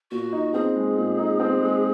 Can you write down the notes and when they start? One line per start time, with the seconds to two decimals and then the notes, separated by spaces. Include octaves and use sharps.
0.11 A#2 F#4
0.33 D#4
0.54 C4 G#4
0.75 G#3
0.96 A#2
1.18 D#4
1.40 C4
1.61 G#3